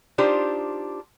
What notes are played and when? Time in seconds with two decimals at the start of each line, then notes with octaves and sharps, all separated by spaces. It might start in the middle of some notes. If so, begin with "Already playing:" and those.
0.18 D4 D#4 F4 G4 C5